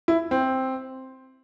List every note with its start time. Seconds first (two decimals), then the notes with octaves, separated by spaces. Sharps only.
0.08 E4
0.31 C4